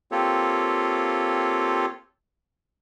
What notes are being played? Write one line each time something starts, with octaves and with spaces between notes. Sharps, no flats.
A#3 C4 F4 G4 A4 C#5